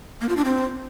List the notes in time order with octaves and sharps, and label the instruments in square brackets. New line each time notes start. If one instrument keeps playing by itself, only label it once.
[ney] A#3
F4
D4
C4